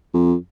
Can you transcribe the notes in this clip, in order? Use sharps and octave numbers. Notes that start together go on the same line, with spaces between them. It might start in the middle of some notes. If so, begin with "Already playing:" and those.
F2